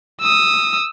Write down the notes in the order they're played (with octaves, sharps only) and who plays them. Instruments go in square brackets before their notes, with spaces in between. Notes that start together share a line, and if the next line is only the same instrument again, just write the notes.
[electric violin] D#6 E6